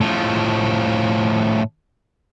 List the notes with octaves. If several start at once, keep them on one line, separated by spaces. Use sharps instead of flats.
A2 F3